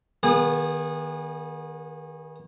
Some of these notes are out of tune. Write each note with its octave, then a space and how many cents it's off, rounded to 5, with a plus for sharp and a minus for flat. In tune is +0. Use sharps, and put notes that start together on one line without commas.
D#3 +0 B3 -35 G#4 -25